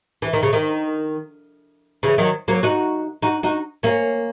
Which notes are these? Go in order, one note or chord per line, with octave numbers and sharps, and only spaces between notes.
E3
D#3
C#3
D#3
C#3 E3
D#3 F#3
F#3 A#3
D#4 F#4
D#4 F#4
D#4 F#4
A#3 C#4